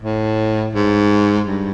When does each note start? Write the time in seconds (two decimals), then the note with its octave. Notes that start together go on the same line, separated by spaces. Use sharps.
0.02 A2
0.74 G#2
1.46 G2